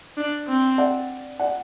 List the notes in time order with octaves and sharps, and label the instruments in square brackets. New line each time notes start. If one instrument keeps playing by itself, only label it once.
[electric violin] D4
C4
[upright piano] D5 F#5
D5 F#5